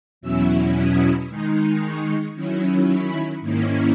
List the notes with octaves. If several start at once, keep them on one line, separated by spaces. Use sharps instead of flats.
E2 B2 F#3 C#4 E4 E6
D#6
D#3 G#3 D#4
C#6
D#3 F#3 C#4 E4
B5
G#2 D#3 A#3 C#4 E4